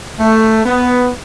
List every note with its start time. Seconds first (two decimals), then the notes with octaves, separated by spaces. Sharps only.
0.18 A3
0.65 B3